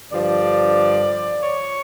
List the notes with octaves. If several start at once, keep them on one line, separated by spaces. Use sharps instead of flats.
G2 D3 F3 D5
C#5